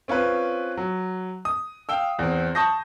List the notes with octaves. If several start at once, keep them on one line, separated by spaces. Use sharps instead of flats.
C4 C#4 F4 B4
F#3
D#6
F5 G5 E6
E2 C4
A5 C#6 D#6 G6 A#6